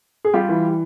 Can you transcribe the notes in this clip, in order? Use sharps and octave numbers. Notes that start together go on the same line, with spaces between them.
G#4
G3 F4 G4
E3